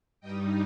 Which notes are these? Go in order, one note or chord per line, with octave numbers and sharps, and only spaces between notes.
G2 G3 D#4 D#5 G5